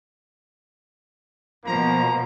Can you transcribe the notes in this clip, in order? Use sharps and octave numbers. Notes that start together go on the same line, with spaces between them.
B2 F3 A#3 A#5